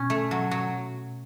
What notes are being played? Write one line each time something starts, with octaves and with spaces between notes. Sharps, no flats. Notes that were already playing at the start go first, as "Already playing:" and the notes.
Already playing: B2 C#4
A3
F#3
F#3